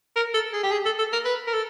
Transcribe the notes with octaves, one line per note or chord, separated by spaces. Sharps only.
A#4
A4
G#4
G4
G#4
A4
A4
A#4
B4
A#4
A4